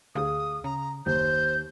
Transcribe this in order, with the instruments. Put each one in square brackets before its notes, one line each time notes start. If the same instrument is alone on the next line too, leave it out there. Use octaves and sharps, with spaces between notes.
[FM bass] D2 [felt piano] G#4 F5 [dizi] D#6
[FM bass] C#3 [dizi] A#5
[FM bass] F#1 [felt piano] D#2 [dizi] C5 [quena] G6